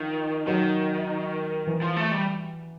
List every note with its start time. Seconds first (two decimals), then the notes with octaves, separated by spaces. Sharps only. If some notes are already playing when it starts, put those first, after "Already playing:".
Already playing: D#3 F3
0.47 D#3 F#3
1.67 E3
1.82 F3
1.96 A3
2.12 G3